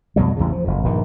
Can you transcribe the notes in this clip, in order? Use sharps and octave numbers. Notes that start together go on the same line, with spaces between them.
F2 B2 F#3 G3
A1 E2 G#2 C#3
F3
F#1 F2
A#1 G2 D#3